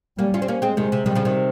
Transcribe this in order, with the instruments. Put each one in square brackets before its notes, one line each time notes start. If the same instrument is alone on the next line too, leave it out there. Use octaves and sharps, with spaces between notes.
[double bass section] G3 [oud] A#3 C#4
[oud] C#4 F4
C4
A#3 C#4
G#3 C4
[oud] C3 D#3 [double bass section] G#3
[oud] C3
[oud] C3 D#3 [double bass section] G3
[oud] C#3 F3
C3 D#3